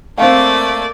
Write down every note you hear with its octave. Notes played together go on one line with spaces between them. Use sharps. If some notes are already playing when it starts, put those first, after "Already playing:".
A3 A#3 C4 D5 F5